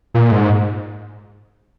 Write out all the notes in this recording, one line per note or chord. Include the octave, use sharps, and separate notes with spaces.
A#2
G#2